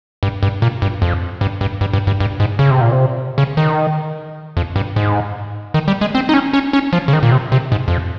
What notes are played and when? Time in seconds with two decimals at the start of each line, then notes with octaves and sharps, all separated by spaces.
0.23 G2
0.43 G2
0.62 A#2
0.82 G2
1.02 F2
1.41 G2
1.61 G2
1.81 G2
1.93 G2
2.07 G2
2.20 G2
2.40 G#2
2.59 C#3
2.70 C3
2.81 A#2
2.92 C3
3.38 C#3
3.57 D#3
4.57 F2
4.76 G2
4.96 G#2
5.74 D#3
5.88 G3
6.01 G#3
6.15 C4
6.29 D#4
6.34 C#4
6.53 C#4
6.73 C#4
6.93 F3
7.08 C#3
7.13 D#3
7.23 A#2
7.32 C3
7.52 C3
7.72 G#2
7.88 F2